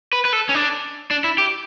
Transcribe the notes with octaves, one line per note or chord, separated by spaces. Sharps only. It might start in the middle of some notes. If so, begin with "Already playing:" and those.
B4
B4
A4
C#4
D4
D4
E4
G4